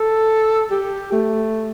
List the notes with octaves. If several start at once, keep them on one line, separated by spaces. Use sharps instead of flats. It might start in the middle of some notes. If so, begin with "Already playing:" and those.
Already playing: A4
G4
A3